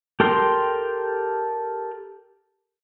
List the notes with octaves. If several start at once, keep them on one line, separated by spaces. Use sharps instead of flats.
G4 A4 A#4 G5 C6